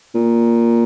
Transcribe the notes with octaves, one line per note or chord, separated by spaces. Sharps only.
A#2